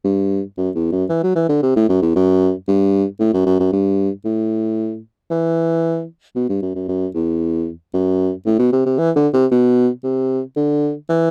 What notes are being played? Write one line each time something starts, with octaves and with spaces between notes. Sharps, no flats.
G2
F#2
E2
F#2
E3
F#3
E3
D3
C3
A2
F#2
E2
F#2
G2
A2
F#2
F#2
F#2
G2
A2
E3
B2
G2
F#2
F#2
F#2
E2
F#2
A2
B2
C3
C3
E3
D3
C3
B2
C3
D3
E3